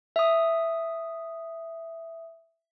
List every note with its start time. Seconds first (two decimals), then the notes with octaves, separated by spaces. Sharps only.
0.16 E5 D#6